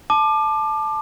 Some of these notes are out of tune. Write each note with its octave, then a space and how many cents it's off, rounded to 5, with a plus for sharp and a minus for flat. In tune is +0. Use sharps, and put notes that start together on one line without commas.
A5 -10 D6 +25